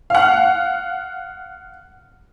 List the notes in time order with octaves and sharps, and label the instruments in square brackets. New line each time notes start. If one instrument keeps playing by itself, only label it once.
[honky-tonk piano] F5 F#5